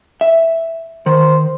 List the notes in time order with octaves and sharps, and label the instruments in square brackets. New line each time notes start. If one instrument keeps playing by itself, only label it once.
[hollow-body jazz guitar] E5
[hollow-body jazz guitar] D#3 [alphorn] C5